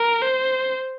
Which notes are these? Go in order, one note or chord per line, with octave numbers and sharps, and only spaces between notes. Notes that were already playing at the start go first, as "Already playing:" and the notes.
Already playing: A#4
C5